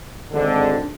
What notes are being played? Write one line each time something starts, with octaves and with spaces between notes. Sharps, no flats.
G#1 D3 D4